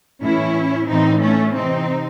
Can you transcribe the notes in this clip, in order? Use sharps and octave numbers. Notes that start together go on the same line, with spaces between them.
A2 E3 C#4 E4
A2 E3 C4 D#4
A3 C#4
C3 E3 C4 D#4